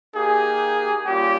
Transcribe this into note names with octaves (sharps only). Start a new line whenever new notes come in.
A#3 D#4 G4 G#4
G3 A#3 C#4 F4 G4